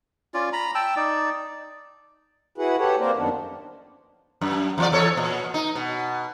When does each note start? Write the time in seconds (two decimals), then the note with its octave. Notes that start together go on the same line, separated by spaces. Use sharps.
0.34 C#4 F4 D5
0.53 A#5 B5
0.75 G5 A5 E6
0.96 D#4 D5
2.58 E4 F#4 G#4 B4 F#5
2.78 G4 A4 B4 C#5 F#5
2.99 A#3 C4 A#4 C5 D5
3.16 F#2 D#3 B3 D4
4.41 F#2
4.78 E2 F4 D5
4.92 E2 A4 C#5
5.17 A#2
5.54 D#4
5.75 B2